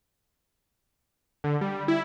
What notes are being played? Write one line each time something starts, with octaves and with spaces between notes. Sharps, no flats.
D3
G3
E4